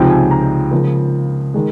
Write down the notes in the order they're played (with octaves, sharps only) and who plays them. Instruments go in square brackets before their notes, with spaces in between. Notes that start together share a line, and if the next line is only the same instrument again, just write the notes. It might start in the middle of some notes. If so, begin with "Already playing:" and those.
Already playing: [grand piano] C#2 C3 F3 C4 D#4 G5
G#5
A#5
C#2 C#3 F3 A#3
D#3 G#3